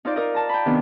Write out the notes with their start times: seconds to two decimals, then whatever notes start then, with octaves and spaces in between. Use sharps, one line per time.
0.05 D#4 F4 C5 D5
0.16 D#4 A#4 D5 D#5
0.34 A5 A#5
0.49 G5 B5
0.65 C3 D#3 B3 D4